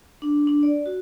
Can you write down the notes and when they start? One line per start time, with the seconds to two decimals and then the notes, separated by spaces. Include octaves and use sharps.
0.22 D4
0.47 D4
0.63 D5
0.86 F#4